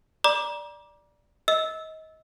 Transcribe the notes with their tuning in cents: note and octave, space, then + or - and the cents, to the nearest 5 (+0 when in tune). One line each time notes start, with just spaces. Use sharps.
D5 +0 A#5 +35 D6 +0
D#5 +25 E6 -15